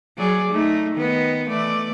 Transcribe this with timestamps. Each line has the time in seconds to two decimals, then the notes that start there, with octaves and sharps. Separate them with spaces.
0.18 F#3 G#4 D5
0.50 A3 D#4
0.95 D#3 B3 D#5
1.49 E3 A3 D5